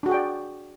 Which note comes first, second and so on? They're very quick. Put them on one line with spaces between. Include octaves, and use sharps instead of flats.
D4 F#4 G#4 G5 D5